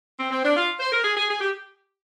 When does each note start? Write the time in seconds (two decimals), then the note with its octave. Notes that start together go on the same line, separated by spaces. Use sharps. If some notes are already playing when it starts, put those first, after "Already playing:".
0.19 C4
0.31 C4
0.43 D4
0.55 F4
0.80 C5
0.92 A#4
1.04 G#4
1.16 G#4
1.28 G#4
1.41 G4